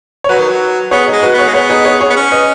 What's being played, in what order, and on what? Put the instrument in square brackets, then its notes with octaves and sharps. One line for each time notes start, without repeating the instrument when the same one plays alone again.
[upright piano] C#5
[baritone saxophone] F#3 [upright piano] F#4 B4
[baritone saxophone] D#3
F#3
[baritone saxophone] B3 [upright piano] G#4 C#5
[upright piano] D#4 G#4
[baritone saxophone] G#3
[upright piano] F#4 B4
[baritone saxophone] B3 [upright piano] G#4 C#5
[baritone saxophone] G#3
[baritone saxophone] B3 [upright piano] G#4 C#5
[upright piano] D#4 G#4
G#4 C#5
G#4 C#5
[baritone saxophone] B3
C#4
[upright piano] B4 D#5